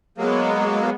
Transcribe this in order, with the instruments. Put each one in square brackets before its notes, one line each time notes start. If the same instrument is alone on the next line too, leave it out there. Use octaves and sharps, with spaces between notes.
[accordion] F#3 A#3 [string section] G#3 B3